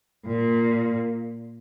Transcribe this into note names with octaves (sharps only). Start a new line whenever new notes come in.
A#2